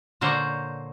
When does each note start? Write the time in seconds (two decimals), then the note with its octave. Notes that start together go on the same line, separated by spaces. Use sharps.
0.21 A#2 D3 A#3 C5 C#5 F#5